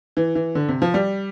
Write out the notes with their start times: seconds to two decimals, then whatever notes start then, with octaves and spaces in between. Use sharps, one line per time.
0.17 E3
0.35 E3
0.55 D3
0.68 C3
0.82 F3
0.94 G3